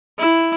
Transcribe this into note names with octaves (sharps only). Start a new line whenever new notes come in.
E4